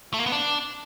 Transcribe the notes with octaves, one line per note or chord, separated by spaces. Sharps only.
A3
A#3
B3
D4